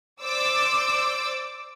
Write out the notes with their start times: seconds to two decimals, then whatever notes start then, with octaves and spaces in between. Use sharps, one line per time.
0.22 C5 D5 D6 E6